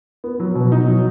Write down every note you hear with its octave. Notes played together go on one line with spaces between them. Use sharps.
B3
F#3
B2
D#4
F#3